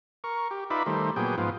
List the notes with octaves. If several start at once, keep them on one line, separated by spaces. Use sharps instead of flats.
A#4 C#6
G4
D#4 F4 B4 D5 E5 B5
D#3 G3 A3 C5
A#2 F#3 B3 G#4 G5
G#2 F3 B3 F4